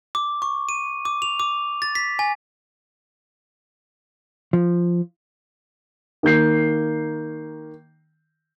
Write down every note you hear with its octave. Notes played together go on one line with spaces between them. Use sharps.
D6
C#6
D#7
D6
F7
D6
A6
B6
G#5
F3
D#3 A#3 G6 C7